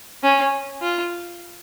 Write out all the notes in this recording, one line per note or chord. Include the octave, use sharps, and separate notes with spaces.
C#4
F4